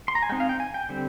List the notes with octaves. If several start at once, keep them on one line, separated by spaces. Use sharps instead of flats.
C6
A#5
G#5
G#3 C4 D#4 G5
F5
G5
G#5
G5
D3 G3 C4